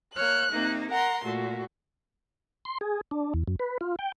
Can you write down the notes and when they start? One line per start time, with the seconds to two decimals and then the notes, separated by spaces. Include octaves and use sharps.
0.15 A#3 C#5 F6 F#6
0.51 C3 A#3 D#4
0.90 A#4 F#5 A#5 C6
1.24 A#2 A3 F#4
2.65 C6
2.81 G#4
3.11 D4
3.34 E2
3.48 F#2
3.60 B4
3.81 F4
3.99 G5